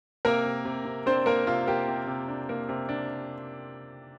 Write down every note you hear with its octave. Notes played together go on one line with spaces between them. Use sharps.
C3 A#3 A#4
C3
C3
C3
C4 D4 C5
A#3 A#4
C3 F4
A#3 G4
C3
C3
D4
A#3
C3
D4